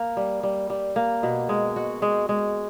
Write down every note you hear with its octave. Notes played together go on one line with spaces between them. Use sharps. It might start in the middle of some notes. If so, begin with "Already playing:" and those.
Already playing: A#3
G3
G3
G3
A#3
B2
G#3
F#4
G#3
G#3